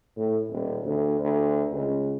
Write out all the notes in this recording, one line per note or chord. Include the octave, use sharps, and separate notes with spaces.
A2
D#1
D2
D2
C#2